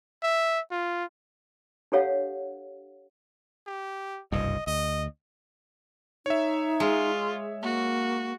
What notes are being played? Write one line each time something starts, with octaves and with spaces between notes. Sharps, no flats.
E5
F4
D4 G4 A4 C#5 F5 F#5
G4
F#1 C2 G2 D#5
D2 D#5
D#4 C#5 E5
G#3 F4
A#3 F#4